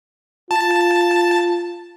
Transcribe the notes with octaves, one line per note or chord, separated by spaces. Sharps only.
F4 A5